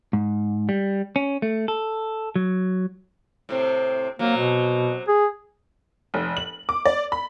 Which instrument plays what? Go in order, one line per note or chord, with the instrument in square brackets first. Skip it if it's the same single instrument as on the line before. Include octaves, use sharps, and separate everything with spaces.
[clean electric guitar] G#2
G3
C#4
A3
A4
F#3
[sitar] A2 C3 C4
[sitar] C3 F#3 [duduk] A#3
[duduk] B2
G#4
[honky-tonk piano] F1
F#7
D6
D5
B5